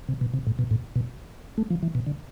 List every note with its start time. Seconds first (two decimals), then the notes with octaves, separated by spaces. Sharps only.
0.09 C3
0.21 B2
0.34 C3
0.47 A2
0.59 B2
0.71 A2
0.96 B2
1.58 A3
1.70 F3
1.83 E3
1.95 B2
2.06 D3